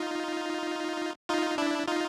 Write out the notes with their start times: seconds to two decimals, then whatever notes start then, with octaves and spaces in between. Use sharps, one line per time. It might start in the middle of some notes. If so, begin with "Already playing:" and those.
Already playing: D#4 F4
1.29 D#4 F4
1.58 D4 E4
1.87 D#4 F4